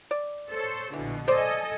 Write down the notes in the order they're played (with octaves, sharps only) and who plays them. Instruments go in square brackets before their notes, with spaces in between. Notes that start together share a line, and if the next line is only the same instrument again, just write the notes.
[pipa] D5
[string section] A4 C5 C#5
[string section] A#1 B2 D3 [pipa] E3
[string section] A4 D#5 G#5 [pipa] C5 D5